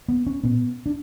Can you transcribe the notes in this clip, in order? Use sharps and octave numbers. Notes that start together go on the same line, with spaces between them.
B3
C#4
A#2 B3
D4